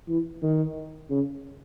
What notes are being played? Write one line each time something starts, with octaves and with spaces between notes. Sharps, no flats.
E3
D#3
C#3